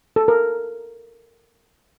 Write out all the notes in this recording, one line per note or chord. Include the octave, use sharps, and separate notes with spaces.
A4
A#4